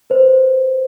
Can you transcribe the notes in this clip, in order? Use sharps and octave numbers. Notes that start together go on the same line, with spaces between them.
B4 C5